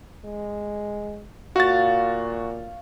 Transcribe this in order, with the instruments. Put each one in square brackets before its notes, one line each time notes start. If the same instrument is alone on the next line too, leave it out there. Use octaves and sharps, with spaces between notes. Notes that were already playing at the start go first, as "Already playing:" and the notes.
[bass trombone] G#3
[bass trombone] A#2 [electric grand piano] F#4 A6 [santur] C#5 F5